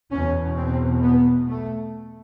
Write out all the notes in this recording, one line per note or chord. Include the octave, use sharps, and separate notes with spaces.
E2 B2 C#4
C4
B3
A3